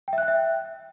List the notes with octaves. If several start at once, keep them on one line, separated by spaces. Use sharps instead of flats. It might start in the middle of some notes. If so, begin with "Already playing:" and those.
G5
E5
F#6
G5
E5